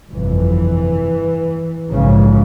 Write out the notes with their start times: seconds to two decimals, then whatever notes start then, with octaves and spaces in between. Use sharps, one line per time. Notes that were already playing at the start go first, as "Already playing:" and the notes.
0.11 G1 F2 C3 E3
1.91 A#1 G#2 C#3